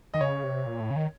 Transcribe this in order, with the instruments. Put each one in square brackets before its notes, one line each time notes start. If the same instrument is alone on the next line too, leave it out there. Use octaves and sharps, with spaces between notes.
[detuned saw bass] D#3 [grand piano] D#5
[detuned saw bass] C#3 [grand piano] C#5
[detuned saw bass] C3
A#2
A2
C#3
D#3